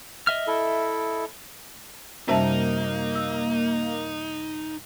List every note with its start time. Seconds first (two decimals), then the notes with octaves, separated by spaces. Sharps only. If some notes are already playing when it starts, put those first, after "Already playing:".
0.27 D#5 E5 F6
0.47 E4 A4
2.28 F#2 C3 G3 A#3 C#4 D#4 E5 A5
3.15 E6